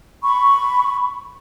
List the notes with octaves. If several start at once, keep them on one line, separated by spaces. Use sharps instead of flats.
B5 C#6